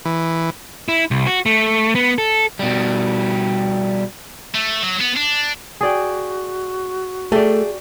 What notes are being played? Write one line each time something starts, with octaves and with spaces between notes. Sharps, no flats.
E3
E4
C2
F#4
A3
B3
A4
B2 G3
A3
F#3
B3
D4
F#4 G#4 D5 G5
A3 G4 G#4 D5